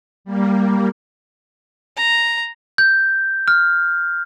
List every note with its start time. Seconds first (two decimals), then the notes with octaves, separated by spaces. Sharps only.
0.25 G3 A#3
1.97 A#5
2.78 G6
3.48 F6